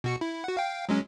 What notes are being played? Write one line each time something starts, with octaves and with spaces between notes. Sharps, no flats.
B2 F#4 C#7
E4
F#4 F#5
F5 G5
F#3 G#3 C#4